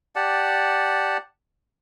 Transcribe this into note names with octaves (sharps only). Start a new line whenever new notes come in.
G4 D5 F#5 A5